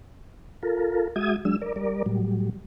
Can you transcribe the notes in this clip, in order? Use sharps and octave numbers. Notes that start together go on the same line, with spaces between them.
F4 A4 A#4
G#3 F#4 E5 D#6 G#6
F#3 G#3 D4 E6
A#4 D5
G3 A#4 D5
A2 F#3 G3